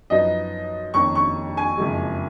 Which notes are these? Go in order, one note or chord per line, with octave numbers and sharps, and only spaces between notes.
F#2 F3 B3 D#4 D#5
F2 D#3 A#3 C#4 C#6
C#6
G#5
F#1 F2 F3 G#3